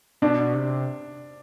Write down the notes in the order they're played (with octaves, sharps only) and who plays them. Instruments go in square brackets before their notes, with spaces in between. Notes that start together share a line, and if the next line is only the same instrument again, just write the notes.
[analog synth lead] B2 [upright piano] D4
[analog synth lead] C3